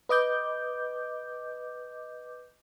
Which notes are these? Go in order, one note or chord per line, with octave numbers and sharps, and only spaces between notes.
B4 D#5 D6 G6